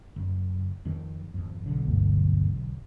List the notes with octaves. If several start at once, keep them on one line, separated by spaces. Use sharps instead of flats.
F#1
F2 D#3
G#1 F2
E1 B1 D3
G1 D2